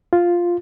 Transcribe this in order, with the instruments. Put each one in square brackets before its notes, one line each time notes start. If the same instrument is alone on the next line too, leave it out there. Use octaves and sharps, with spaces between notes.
[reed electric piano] F4